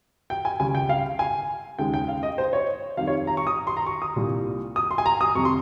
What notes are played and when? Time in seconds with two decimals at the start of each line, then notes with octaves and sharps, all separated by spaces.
0.30 G5
0.45 G#5
0.60 C#2 C#3 G3 G#5
0.75 G5
0.89 F5
1.19 G#5
1.79 D#2 C#3 G#3 G5
1.94 G5
2.08 F5
2.23 D#5
2.38 C5
2.53 C#5
2.97 F2 D#3 G3 F5
3.07 C#5
3.27 A#5
3.37 C#6
3.47 D#6
3.67 C6
3.77 A#5
3.87 C#6
4.02 D#6
4.16 C2 A#2 G3
4.76 D#6
4.91 C6
4.98 G#5
5.06 A#5
5.21 D#6
5.35 F2 C3 G3 C#6
5.45 C6